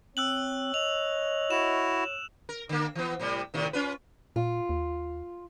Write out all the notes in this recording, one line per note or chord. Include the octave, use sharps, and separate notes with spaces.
C4 C#5 E6 F#6 F#7
D#5 F7
E4 F#4 E7
A#4
D3 A#3
E3 B3
A2 C3 G3
A2 C3 D#3
C#4 F4 B4
A#2 F4
D#2